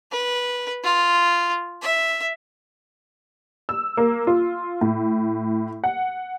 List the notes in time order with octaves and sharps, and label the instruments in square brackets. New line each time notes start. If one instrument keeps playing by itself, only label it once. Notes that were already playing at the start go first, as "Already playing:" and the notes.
[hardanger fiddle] B4
F4
E5
[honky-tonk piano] E6
A#3
F4
A2
F#5